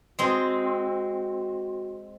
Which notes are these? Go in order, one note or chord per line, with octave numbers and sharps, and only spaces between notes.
G#3 C4 F#4